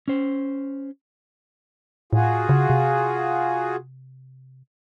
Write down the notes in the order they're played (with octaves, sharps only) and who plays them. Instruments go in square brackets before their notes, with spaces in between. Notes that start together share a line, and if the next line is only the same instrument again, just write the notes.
[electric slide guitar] C#4 C5
[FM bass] A2 [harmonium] F4 F#4 G#4
[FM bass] C#3
C3